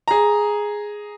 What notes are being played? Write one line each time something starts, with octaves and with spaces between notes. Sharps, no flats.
G#4 A#5